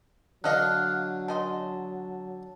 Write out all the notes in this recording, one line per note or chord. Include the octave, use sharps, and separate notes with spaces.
D3 F#3 D4 A4 D#5 F5 F6 F#6
C#3 D#5 A5 C6